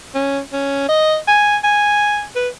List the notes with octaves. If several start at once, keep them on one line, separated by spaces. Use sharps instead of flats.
C#4
C#4
D#5
G#5
G#5
B4